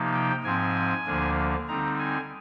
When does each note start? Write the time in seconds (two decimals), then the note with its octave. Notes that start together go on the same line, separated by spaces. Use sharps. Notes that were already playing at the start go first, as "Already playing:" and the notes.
Already playing: C3 F3 A#3 D#4
0.14 G5
0.44 G#2 F3 C4 G#5
1.06 D2 D3 F3 A#3 D4
1.68 D3 G3 C4 D#4 A#5
1.99 G#5